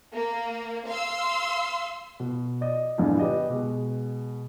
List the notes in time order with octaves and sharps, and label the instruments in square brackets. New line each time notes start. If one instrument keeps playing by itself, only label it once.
[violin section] A#3
F5 C6 E6
[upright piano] B2
D5 D#5
E2 G2 A#2 D3
B3 G4 D#5
B2 G#3